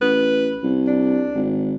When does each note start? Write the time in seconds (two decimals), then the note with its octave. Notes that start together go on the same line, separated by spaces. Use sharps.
0.01 A1 B4
0.63 C2
0.87 D4
1.35 G#1